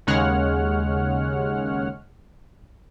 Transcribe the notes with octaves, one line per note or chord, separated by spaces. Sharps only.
D#2 C#3 G#3 C#5 F#5 F6